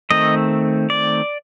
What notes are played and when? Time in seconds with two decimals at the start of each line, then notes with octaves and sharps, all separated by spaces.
0.10 D#3 A3 C4 D#5
0.90 D5